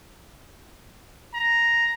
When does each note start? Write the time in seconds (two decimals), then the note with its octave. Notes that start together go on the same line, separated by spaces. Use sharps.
1.34 A#5